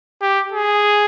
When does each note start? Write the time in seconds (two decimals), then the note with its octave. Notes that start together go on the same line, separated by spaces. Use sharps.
0.21 G4
0.52 G#4